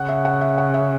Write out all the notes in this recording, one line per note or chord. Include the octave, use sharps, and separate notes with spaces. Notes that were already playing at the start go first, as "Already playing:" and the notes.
Already playing: C#3 F#5
E5
F#5
E5
F#5
E5